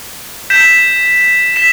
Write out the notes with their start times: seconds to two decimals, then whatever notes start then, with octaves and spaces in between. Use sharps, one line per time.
0.50 G6 B6 E7
1.56 B6 E7